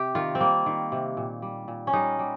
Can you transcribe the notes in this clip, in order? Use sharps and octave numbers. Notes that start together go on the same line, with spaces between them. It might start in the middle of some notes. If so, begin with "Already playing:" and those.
Already playing: C3 G4
D#3 F4
C4
G3 A#3
D#3
C3
A#2
G3
A#2
C#4
G3 D#4
G3